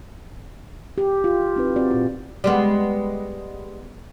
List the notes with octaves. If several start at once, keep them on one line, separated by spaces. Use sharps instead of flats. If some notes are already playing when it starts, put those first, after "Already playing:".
G4
F4
C4 D#4 E4 B4
C4 F#4 D5
A#2 F4
G3 G#3 B3